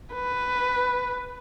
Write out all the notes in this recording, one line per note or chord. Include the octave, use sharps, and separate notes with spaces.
B4